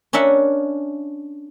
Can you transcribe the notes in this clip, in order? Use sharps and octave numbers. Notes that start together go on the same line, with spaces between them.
C#4 D4 A#4 E5 F#5